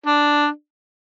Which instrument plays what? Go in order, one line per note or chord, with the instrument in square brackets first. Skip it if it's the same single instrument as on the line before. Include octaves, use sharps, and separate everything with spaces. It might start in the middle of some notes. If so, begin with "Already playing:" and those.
[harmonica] D4